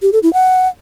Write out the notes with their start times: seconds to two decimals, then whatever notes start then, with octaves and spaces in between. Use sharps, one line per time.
0.02 G4
0.13 A4
0.23 E4
0.33 F#5